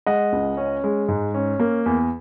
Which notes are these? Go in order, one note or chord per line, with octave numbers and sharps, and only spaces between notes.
G#3 D#5 F#5
C#2
C#4
G#3
G#2
C#4
A#3
E2